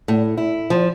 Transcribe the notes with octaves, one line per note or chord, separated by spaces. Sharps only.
A2
E4
F3